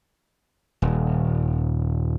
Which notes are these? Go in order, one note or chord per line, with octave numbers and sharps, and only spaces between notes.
D#1